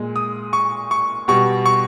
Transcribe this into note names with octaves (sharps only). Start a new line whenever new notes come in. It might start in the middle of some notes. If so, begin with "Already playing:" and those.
Already playing: A#2 G#3
D#6
C#6
C#6
B2 G3 C#6
C#6